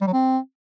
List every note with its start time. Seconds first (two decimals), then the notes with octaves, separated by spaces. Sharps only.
0.01 G3
0.07 F#3
0.13 C4